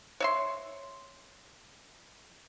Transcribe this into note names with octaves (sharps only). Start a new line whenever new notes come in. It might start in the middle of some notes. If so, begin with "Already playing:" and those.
C#5 E5 C6